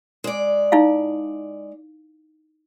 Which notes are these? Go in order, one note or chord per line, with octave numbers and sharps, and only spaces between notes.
G#3 D5
D#4 E4 F5